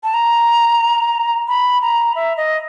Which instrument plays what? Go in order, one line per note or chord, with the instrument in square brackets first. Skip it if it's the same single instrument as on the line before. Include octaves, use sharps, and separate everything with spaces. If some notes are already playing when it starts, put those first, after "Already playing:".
[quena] A5
A#5
B5
A#5
E5
D#5